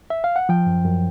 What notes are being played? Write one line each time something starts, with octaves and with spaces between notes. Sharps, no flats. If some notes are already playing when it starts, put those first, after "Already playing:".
E5
F5
F#5
F3 G5
F#2
F#2